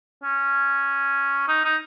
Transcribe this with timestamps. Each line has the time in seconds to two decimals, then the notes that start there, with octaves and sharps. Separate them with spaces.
0.24 C#4
1.48 D#4
1.64 D#4